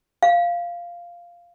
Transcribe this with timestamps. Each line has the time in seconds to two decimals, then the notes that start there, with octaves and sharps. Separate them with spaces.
0.23 F5